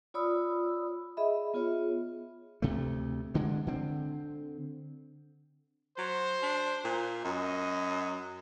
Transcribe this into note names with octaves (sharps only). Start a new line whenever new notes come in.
F4 C#5 D5 B5 D#6 E6
G#4 D#5 E5 B5
B3 F4 G#4 C#5
D2 C3 A3
G2 D3 G#3
D3 C4
F#3 C5
D4
A#2
F#2 D#5